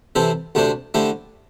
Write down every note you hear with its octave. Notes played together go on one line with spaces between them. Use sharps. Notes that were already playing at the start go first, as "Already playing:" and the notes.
C3 E3 C4 A4 C5
D2 C3 A3 D4 C5
D3 A3 E4 G4 C5